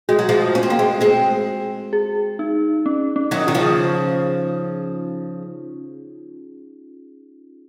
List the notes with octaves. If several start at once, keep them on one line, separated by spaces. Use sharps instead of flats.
G#3 F#4
F#3
F3 G#3
C#4
C4
A#3
G#3 C4
G#3 C4
G#4
D#4
C#4
C#4
D#3 F#3
D#3 F4
C#3 F3